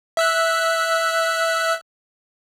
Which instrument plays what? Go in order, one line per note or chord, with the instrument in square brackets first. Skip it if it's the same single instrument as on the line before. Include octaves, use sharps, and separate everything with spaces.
[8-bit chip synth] E5 E6 F#6